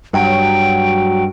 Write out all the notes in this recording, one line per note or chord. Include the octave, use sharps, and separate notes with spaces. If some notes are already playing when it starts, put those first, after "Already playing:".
G2 F#3 G5